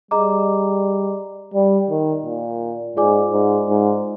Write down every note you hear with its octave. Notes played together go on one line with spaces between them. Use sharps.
G3 G#4 D#5 A#5 D6
G3
D#3
A#2
G#2 F4 G#4 D5 G#5 D6
G#2
G#2